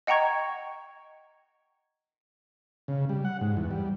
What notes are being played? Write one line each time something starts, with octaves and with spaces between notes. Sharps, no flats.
D#5 F#5 G5 A#5 C#6 G#6
C#3
G3
F#5
G#2
E2
G3